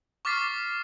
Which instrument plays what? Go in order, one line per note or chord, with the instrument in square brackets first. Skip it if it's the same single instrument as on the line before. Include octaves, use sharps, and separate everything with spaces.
[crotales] C#6 D6 F6 A6 B6 C7